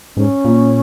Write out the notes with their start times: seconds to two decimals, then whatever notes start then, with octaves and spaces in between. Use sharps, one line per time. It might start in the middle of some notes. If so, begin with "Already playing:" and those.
0.16 G#2 C#4
0.45 A#2